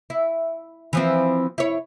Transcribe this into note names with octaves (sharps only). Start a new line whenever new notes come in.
E4
E3 F3 C4
E4 C#5